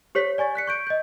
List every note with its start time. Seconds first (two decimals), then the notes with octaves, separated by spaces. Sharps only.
0.15 G4 C5 C#5 B6
0.38 D5 G#5 C#6 A6
0.55 F#6 B6 C#7
0.67 C#6 G6 D7
0.87 D#5 G6